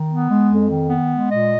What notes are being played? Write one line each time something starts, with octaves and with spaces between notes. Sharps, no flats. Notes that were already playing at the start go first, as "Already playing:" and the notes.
Already playing: D#3
B3
G#3
F2
D#3
B3
G#3
A#2 D#5